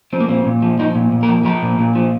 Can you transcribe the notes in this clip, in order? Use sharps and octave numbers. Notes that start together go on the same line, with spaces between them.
F3 C4
A#3
A#2 C4
A#2
F3
F3 D#4
A#2
A#2
A#4
F3
F3 A#4
A#2
A#2
F3